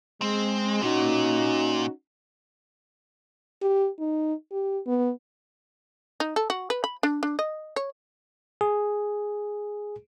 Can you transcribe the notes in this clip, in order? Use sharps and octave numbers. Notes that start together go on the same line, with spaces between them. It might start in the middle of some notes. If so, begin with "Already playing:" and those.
G#3 C4
A#2 C#4 D#4 F#4
G4
D#4
G4
B3
D#4
A4
F#4
B4
B5
D4
D4
D#5
C#5
G#4